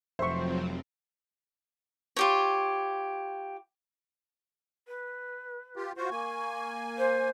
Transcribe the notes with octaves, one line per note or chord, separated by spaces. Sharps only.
F1 F3 F#3 C4 C5 E5 C#6
F4 G4 C#5
B4
F4 G4
F4 F#4 C5 C#6
A#3 G#5
C5